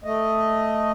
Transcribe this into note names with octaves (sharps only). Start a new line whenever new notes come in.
A3 D#5